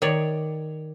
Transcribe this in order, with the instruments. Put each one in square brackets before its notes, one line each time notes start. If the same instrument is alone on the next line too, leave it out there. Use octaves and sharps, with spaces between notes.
[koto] D#3 C#5 D5